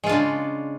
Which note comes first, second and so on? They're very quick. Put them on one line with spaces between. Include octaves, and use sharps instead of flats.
G#3 F4 D4 C#3